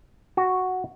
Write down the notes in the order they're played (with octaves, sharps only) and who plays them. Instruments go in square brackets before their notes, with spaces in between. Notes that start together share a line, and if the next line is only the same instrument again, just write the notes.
[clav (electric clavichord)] F#4